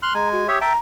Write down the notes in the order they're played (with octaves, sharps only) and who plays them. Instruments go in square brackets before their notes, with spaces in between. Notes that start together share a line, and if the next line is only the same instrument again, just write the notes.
[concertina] C6 F6 F#6
[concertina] G#3 G#5 [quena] A#5
[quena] F#4
[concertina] G4 C#5 E5 [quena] D#6
[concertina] E5 G5 A5 [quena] A#5